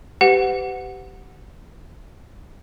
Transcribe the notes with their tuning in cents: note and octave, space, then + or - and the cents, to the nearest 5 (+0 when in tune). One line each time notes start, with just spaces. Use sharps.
G4 -15 B4 +40 F#5 -10